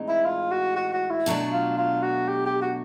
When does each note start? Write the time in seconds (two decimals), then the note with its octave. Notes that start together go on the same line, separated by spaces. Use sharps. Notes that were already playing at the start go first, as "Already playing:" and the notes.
Already playing: A2 E3 G#3 C4 D#4
0.09 E4
0.26 F4
0.51 F#4
0.76 F#4
0.93 F#4
1.10 E4
1.26 B2 F#3 A3 D4
1.52 F4
1.78 F4
2.02 F#4
2.28 G4
2.46 G4
2.62 F#4